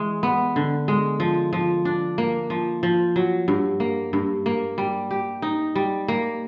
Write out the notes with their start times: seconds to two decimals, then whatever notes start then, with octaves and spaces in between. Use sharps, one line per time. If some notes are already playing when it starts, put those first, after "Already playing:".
Already playing: E3 G#3
0.23 B3
0.56 D3
0.88 G#3
1.20 F3
1.53 F3
1.85 D4
2.18 A#3
2.50 F3
2.83 F3
3.16 F#3
3.48 G2
3.80 A#3
4.13 G2
4.46 A#3
4.78 G3
5.11 G4
5.42 D#4
5.75 G3
6.08 A#3